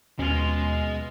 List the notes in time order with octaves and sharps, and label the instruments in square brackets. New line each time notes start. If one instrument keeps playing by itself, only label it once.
[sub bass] D#2 [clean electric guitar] B2 F4 [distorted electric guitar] G#3 [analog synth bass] C#4